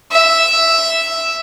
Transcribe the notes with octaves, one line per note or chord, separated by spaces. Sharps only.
E5